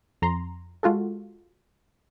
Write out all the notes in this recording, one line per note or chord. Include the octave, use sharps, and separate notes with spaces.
F2 A#5 C6
G#3 F4 F#4 A4